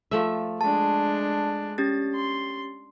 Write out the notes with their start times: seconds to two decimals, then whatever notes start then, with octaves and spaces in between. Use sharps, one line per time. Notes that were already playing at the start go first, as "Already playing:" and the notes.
0.11 F3 A3 E5
0.61 G#3 D4 A5
1.78 C#4 G4 A6
2.16 C6